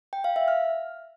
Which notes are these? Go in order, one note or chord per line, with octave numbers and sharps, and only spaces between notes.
G5
F5
E5
F6